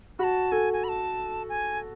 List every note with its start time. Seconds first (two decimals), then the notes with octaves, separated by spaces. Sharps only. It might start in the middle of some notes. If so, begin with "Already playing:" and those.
0.19 F#4 B5
0.24 A5
0.52 A4 G#5
0.73 G#5
0.84 B5
0.89 A5
1.49 G#5